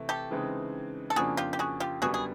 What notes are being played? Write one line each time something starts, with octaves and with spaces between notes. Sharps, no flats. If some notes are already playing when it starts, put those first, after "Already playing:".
Already playing: C3 E3 A3
G4 A4
C#3 E3 G#3 C4 D#4
A4
F2 C#3 F3 A#3 D4 F#4 G#4
F4 G4
G4
F#4 G#4
F4 G4
F#2 D3 G3 B3 F#4 G#4
G#4